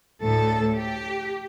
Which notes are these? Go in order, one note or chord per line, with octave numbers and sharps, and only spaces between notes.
D2 A2 A4
G4